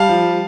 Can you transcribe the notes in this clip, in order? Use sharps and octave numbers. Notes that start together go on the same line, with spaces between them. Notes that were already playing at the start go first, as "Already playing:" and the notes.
Already playing: G3 F5 A5
F3